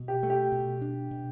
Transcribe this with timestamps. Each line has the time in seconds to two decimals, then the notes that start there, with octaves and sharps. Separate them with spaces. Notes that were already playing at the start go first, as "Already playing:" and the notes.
Already playing: B2
0.08 G4
0.23 A3
0.30 G4
0.52 B2
0.81 D4
1.11 B2